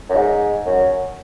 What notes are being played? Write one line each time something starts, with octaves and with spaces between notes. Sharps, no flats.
F#2
G#2
F#2